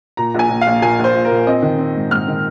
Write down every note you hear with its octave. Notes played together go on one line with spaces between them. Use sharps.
A#2 A#5
A#1 G#5
A#1
F5
A#1
A#2 G#5
A#1
C5
A#1
A#4
A#2
C4 D#5
D#3
C4
G#2
G#2 F6
D#3